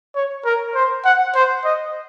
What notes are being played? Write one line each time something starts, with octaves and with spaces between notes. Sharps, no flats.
C#5
A#4
C5
F#5
C5
D#5